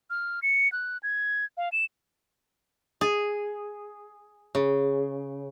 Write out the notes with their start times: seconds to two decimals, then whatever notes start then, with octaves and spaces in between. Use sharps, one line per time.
0.10 F6
0.43 C#7
0.72 F#6
1.03 G#6
1.57 F5
1.72 E7
3.01 G#4
4.55 C#3